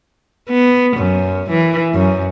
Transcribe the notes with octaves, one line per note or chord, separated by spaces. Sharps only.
B3
F#2
E3
F#2